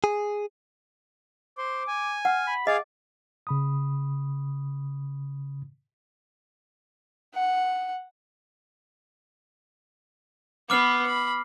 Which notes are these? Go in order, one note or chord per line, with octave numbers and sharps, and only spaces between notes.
G#4
C5 C6 D6
G#5
F5 F#5
B5
G#4 D#5 F5 D6
C#3 B5 D#6
F#5
B3 B4 D6 F6 C7
B5